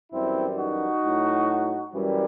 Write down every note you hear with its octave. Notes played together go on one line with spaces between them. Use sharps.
F#2 E3 G3 C4 E4
D#4 F#4
A2 F#3
F#2 E3 G3